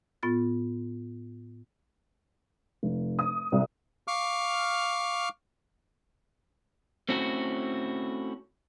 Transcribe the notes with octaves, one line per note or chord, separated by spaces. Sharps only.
A2 B3 F4 A6
F1
D#6
C2
F5 C#6 D6 F6
A3 C4 C#4 E4 F#4 A4